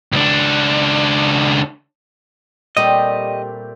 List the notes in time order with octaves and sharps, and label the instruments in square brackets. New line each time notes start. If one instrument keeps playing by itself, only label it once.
[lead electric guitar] C#2 D4
[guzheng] A#2 G3 A3 [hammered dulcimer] C4 G4 [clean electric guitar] D#5